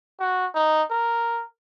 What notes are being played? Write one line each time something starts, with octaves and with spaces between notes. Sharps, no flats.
F#4
D#4
A#4